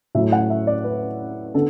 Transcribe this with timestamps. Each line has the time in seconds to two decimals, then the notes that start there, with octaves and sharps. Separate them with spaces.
0.15 A2 F#3 A3 E5
0.32 F#5
0.50 E5
0.67 D5
0.84 B4
1.54 D3 B3 A4